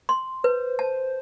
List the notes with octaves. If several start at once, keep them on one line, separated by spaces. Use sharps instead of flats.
C6
B4 C5
C5 A5